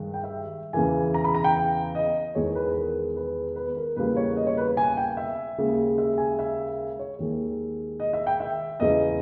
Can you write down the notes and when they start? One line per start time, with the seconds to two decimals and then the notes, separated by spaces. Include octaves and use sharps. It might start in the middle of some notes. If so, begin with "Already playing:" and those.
Already playing: G2 D#3 G#3
0.14 G5
0.24 E5
0.73 E2 C#3 E3 G#5
1.14 A#5
1.24 B5
1.34 A#5
1.44 G5
1.95 D#5
2.35 E2 D#3 G#3 C#5
2.55 B4
2.76 A#4
3.16 B4
3.56 B4
3.77 A#4
3.96 E2 C#3 G3 A#3 B4
4.16 C#5
4.37 D#5
4.47 C#5
4.57 B4
4.77 G#5
4.97 G5
5.17 E5
5.58 D#2 C#3 G#3
5.98 E5
6.18 G#5
6.39 E5
6.99 C#5
7.19 D#2 D#3 G#3
8.00 D#5
8.13 E5
8.27 G5
8.40 E5
8.80 E2 C#3 G#3 D#5